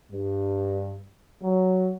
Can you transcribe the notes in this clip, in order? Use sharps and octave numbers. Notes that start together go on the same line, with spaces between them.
G2
F#3